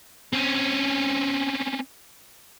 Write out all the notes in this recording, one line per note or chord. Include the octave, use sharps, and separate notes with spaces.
C4 C#4